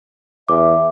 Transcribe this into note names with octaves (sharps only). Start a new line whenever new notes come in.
E2 E5 D6